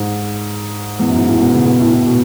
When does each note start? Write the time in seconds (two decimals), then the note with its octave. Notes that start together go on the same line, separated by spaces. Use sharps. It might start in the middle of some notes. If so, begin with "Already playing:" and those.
Already playing: G#2
0.99 E2
1.09 F#2
1.18 G#2
1.28 A2
1.41 B2
1.54 C#3
1.67 B2
1.80 A2
1.93 A2
2.07 B2